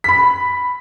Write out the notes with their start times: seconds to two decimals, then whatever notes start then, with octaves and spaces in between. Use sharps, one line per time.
0.04 B5 B6